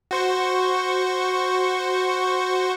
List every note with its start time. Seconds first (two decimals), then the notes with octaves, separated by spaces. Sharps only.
0.11 F#4 C5 C#6